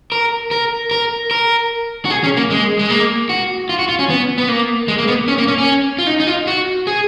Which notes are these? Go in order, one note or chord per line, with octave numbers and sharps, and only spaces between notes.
A#4
A#4
A#4
A#4
F#4
G#4
C#4
A#3
G#3
G#3
A#3
F#4
F4
F#4
F4
C#4
B3
B3
A#3
G#3
A#3
B3
C#4
A#3
C#4
C#4
F4
D#4
D#4
F4
F#4
G#4